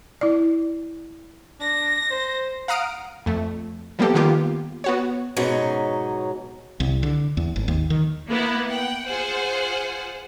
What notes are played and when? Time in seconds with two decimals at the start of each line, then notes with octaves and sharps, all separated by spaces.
0.21 E4 D5
1.60 D4 A#6
2.11 C5
2.68 F5 F#5 A#5 D#6 F6 D7
3.26 F2 A3
3.99 F3 G3 A#3 B3 G4 A4
4.15 D#3 A#3 B3 F4 G4
4.84 B3 F#4 C#5
5.36 G#2 B2 F#3 C#4 D#4
6.80 C2
7.03 D3
7.37 E2
7.56 G#1
7.68 D#2
7.90 D#3
8.28 A#3 B3 E4
8.69 F#5 G5
9.06 F4 G#4 C5 F#5